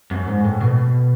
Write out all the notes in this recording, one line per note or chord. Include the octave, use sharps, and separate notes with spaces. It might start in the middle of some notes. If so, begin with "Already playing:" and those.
F#2
G#2
A2
B2